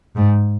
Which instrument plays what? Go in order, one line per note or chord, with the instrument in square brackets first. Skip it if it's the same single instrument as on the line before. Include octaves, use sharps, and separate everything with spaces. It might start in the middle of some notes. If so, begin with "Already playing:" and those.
[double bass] G#2